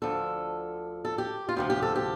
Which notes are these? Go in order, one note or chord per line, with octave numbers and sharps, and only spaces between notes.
D2 D3 F3 A4
A4
G4
F4
D2 C3 F3 G4
G4
A4
G4